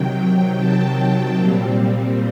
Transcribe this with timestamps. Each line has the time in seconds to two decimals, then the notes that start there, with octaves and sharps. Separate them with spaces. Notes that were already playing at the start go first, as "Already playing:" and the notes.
Already playing: C3 D#3 F#3 G5
0.19 G5
0.58 A5
1.37 A#2 G3 C4